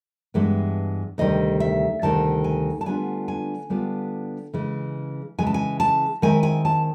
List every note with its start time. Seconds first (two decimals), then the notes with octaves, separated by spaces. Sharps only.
0.34 G2 E3 G#3 B3
1.18 D2 C3 D#3 G3 D#5
1.60 E5
2.02 D2 C3 D#3 G3 A5
2.44 G#5
2.81 A5
2.86 D3 G3 B3 D4 F4 G#5
3.28 G#5
3.70 D3 G3 B3 D4 F4
4.54 C#3 E3 G#3
5.38 C#3 E3 G#3 G#5
5.47 A5
5.54 G#5
5.80 A5
6.22 D#3 G#3 C4 E4 G#5
6.43 G#5
6.65 A5